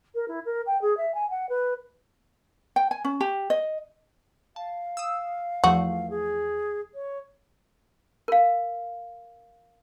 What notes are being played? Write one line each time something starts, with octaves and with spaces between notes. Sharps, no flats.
A#4
E4
A#4
G5
G#4
E5
G#5
F#5
B4
G5
G#5
C#4
G4
D#5
F5 A5
D#6 E6
E2 F3 A3 F#4
G#4
C#5
A#4 F5